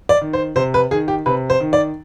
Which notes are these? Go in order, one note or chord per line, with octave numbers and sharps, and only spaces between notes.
D5
D#3
C5
C3 C5
B4
D#3 G#4
G4
C3 B4
C5
D#3
D5